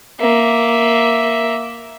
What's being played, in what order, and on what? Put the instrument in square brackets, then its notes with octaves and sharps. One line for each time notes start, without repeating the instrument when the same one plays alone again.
[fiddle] A#3 E5